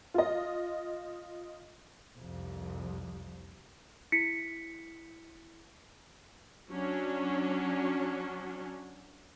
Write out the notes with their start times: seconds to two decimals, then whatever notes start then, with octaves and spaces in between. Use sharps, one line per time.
0.14 F4 D#5
2.18 C2 F2
4.12 E4 B6 C#7
6.69 F#3 C#4 D4